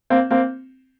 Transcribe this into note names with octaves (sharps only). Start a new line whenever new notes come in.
A#3 C4
A#3 C4